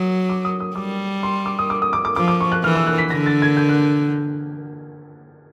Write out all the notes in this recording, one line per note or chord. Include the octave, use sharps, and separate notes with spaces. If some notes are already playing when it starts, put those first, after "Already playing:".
Already playing: F#3 D#6
D6
D#6
D#6
G3 D6
C6
D6
D#6
D6
D#6
D6
D6
F3 D6
D6
C#6
F#6
E3 F6
E6
F#6
B6
D3 A#6
A6
G#6
G6
F#6